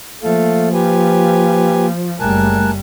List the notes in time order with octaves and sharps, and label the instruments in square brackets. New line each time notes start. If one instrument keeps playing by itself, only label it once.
[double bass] F3 [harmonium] A3 A4 F5 [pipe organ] A#3
[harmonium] G4 B4 G#5
[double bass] F#1 G3 [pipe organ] A3 F#6 [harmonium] A#4 G#5 A5